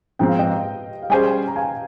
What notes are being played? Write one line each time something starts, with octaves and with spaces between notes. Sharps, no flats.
G#2 F3 C4 G5
F5
D#5 G5
F5
G3 C#4 G#4 C5 D#5 G5
A#5
F5 G#5